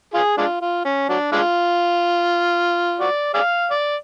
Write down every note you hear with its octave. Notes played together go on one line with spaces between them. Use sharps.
F4 G#4
G#3 D4 F4
F4
C#4
F#3 D4
G#3 D4 F4
F#4 D5
G#4 D5 F5
D5